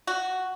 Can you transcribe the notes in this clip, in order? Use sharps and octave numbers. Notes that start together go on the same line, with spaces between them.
F#4